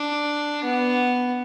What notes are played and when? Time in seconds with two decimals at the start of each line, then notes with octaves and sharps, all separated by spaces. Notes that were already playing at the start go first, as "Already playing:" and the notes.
Already playing: D4
0.64 B3